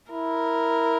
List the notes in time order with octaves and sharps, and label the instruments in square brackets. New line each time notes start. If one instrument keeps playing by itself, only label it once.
[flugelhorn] E4 [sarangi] A#4